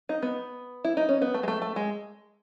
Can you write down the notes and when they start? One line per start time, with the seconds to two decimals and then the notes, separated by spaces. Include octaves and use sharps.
0.09 D#4
0.22 B3
0.84 E4
0.97 D#4
1.09 C#4
1.22 B3
1.34 A3
1.43 G#3
1.48 A3
1.62 A3
1.76 G#3